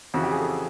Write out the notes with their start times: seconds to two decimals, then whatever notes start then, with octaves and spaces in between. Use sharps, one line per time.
0.14 F2 C#3 E3 F#4
0.23 G4
0.32 G#4
0.40 A4